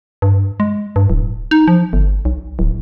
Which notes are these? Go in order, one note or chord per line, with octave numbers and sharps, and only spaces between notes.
G2
G#3
G2
D1
D#4
F3
G1
B1
D1